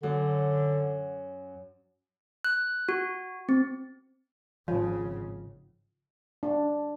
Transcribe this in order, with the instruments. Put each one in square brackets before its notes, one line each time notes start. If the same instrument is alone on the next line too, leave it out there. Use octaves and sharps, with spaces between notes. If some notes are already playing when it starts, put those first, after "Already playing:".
[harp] F#2 [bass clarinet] D3
[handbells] F#6
F#4
C4
[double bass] G#1 C#3 [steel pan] F3
[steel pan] D4